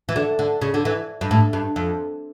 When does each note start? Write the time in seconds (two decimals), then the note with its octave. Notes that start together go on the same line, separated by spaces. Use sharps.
0.09 E3
0.16 D3
0.39 D3
0.62 C#3
0.74 D3
0.85 E3
1.21 G2
1.31 A2
1.53 G2
1.76 F2